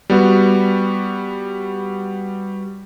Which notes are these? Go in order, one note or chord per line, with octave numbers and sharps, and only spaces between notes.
G3 B3 F#4